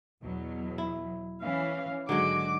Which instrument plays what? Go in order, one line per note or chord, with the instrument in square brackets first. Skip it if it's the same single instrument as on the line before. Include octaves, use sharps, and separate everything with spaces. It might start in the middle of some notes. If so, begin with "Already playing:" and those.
[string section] E2 B2 F#3
[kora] E4
[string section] E3 C#4 [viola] F5
[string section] G#1 D#3 F#4 [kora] D3 F#3 G#3 [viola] D6